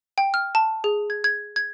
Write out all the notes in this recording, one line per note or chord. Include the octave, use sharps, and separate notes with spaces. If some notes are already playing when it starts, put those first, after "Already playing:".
G5
F6
A5
G#4
G#6
G#6
G#6